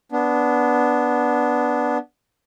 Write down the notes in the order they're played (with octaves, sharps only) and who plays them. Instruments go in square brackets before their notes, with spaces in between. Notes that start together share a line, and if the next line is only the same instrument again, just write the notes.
[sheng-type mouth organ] B3 D4